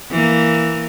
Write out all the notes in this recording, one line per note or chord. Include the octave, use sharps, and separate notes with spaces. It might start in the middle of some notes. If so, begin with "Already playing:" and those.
E3 A#3